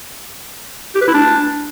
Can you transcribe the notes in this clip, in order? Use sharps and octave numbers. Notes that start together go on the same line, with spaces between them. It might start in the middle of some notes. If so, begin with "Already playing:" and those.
G4
B4
E4
D4